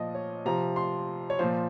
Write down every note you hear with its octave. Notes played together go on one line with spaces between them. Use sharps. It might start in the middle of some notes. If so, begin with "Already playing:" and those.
Already playing: A#2 F3 D#5
C#5
C3 F3 A#5
C6
C#5
A#2 F3 C5